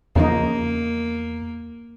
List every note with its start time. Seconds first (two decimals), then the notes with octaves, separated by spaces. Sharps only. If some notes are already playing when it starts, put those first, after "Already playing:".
0.16 E2 C#3 F3 A#3 D#4